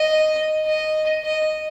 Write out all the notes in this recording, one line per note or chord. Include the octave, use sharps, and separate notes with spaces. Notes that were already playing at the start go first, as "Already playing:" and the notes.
Already playing: D#5
D#5
D#5